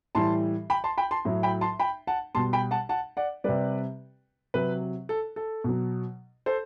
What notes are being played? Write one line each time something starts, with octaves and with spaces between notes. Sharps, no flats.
A2 E3 G3 A5 C6
G5 B5
A5 C6
G5 B5
A5 C6
A2 F#3
G5 B5
A5 C6
G5 B5
F#5 A5
B2 G3 A5 C6
G5 B5
F#5 A5
F#5 A5
D5 F#5
C3 G3 B4 D5
C3 F#3 B4
A4
A4
B2 F#3
A4 C5